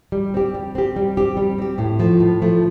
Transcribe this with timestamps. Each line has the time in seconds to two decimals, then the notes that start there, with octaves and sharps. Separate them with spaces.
0.12 G3
0.34 C4 G4
0.54 G3
0.75 C4 G4
0.96 G3
1.17 C4 G4
1.37 G3
1.58 C4 G4
1.78 A2
2.00 F3 A3
2.20 A2
2.42 F3 A3